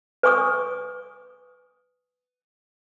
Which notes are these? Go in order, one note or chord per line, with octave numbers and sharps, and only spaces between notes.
B4 G#5 C#6 D#6